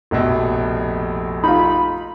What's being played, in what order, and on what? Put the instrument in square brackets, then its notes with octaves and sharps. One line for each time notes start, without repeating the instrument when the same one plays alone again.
[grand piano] F1 A#1 B2
[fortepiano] D#4 F4 [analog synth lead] B5